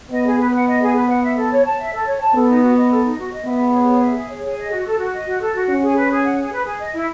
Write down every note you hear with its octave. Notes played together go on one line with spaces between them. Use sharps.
B3 D#5
G#4
B4
F#5
D#5
G#4
B4
F#5
E5
A4
C#5
A5
E5
A4
C#5
A5
B3 A4
D#4
F#4
D#5
A4
D#4
F#4
D#5
B3 E5
G#4
C#5
G#4
E5
G#4
C#5
G#4
D#5
F#4
A4
F#4
D#5
F#4
A4
F#4
C#4 F#5
G#4
B4
G#4
F#5
G#4
B4
G#4
D#5
E4